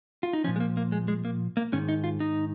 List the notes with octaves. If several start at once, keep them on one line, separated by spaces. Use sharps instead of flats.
F4
D#4
A#2 F3 C#4
G#3
A#3
A#3
G#3
G#3
A#3
A#3
G#2 D#3 C#4
D#4
F4
D#4